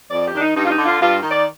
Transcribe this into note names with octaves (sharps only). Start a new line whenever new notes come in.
F2 D5
G4
D#3 D4
D#4
G2 D#4
F4
D#4
D3
F4
G2 F4
D#3
D5